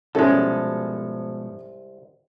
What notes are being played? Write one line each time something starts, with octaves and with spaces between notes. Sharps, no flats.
C2 G#2 B2 F3 G#3 C#4 A4